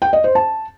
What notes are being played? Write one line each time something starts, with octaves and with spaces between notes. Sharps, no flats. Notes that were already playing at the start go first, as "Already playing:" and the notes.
G5
D#5
C5
A5